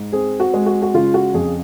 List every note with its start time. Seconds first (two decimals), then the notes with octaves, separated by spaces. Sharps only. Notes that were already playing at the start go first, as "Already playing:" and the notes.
Already playing: G#2
0.12 C4 G#4
0.40 F#4
0.54 G#3
0.66 F#4
0.82 F#4
0.94 C#3 F4
1.14 F#4
1.34 F2 G#4